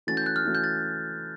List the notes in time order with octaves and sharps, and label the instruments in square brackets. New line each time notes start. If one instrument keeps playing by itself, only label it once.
[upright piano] E3 A3 C#4 F#4 [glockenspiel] A6
[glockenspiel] G6
F#6
F6
[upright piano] E3 A3 C#4 F#4
[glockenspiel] G6
A6